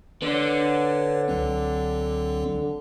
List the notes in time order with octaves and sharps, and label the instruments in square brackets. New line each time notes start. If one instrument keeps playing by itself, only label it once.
[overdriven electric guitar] D3 [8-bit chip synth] B4 C#5
[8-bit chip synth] C#2 F#3 C4